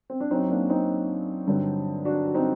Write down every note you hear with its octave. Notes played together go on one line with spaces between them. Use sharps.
C4
D4
F#2 F#3 C4 D#4
A#3 D4
C4 D#4
G2 D3 F#3
D4 F#4
F#4
C4 D#4